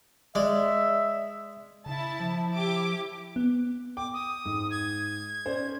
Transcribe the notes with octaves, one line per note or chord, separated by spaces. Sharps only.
G#3 D5 E5
C#3 E4 A5
F3
E4 G4 D6
B3
G5 D6
D#6
G#2
G#6
C#4 C5 D5